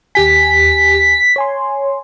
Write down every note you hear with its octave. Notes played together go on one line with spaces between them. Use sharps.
D#2 G4 G#5 B6
C#5 G#5 C6